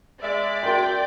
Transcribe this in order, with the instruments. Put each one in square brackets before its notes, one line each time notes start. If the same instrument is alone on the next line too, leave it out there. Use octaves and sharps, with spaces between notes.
[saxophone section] G#3 E5 [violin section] D5
[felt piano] F#4 A#4 C6 [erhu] G5